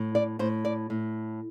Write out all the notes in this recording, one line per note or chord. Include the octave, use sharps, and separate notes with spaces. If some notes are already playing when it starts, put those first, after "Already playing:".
Already playing: A2
D5
A2 C5
D5
A2